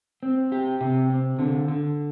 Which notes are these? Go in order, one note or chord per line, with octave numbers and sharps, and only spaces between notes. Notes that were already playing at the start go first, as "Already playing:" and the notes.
C4
G4
C3
C4
D3
D3